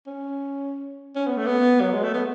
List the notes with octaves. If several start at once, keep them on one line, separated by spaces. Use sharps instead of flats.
C#4
C#4
B3
A3
B3
F#3
G#3
A3
B3